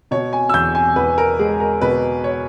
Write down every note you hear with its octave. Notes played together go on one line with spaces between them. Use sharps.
B2 C#5
G#5
E6
E2 G6
G#5
E2 B4
A#4
G#3 G#4
A#4
B2 B4
C#5